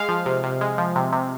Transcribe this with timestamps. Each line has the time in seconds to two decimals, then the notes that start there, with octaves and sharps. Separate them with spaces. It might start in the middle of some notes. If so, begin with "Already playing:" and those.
Already playing: G#3 F5
0.09 F3
0.26 C3
0.44 C3
0.61 G#3
0.78 F3
0.96 C3
1.12 C3